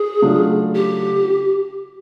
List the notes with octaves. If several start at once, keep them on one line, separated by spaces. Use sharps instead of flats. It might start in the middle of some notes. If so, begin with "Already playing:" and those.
Already playing: G#4
C#3 F#3 A3 D4 F4
G4